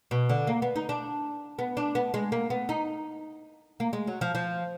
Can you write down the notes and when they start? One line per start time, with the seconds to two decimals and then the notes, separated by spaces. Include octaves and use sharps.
0.11 B2
0.29 D3
0.47 A#3
0.62 B3
0.76 D#4
0.89 D4
1.59 B3
1.77 D4
1.95 B3
2.14 G#3
2.32 A#3
2.50 B3
2.69 D#4
3.80 A#3
3.93 G#3
4.07 F#3
4.21 F3
4.35 F3